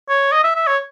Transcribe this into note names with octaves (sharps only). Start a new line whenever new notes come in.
C#5
D#5
E5
E5
C#5